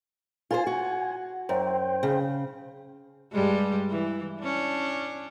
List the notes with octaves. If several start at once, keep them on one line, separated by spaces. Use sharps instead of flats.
F4 B4 C5 G#5
F#4
F#2 C5 G5
C#3
G2 G3 G#3
E3
C#4 D4